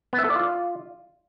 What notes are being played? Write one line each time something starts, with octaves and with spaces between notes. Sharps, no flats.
B3
E5
A4
D5
F4